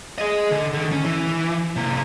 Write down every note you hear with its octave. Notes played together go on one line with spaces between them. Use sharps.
G#4 D#5
D3
D3 D#3
C#4
E3
C3 A#3